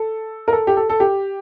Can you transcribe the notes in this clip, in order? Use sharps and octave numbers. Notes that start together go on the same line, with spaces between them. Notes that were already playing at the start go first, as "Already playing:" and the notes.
Already playing: A4
A#4
A4
G4
A4
A4
G4